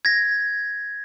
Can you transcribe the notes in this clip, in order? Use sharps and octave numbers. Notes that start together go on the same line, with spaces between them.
G#6 A#6